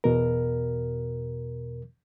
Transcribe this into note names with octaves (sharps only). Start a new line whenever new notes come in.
E2 B2 A#4